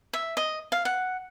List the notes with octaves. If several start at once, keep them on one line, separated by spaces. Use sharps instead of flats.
E5
D#5
F5
F#5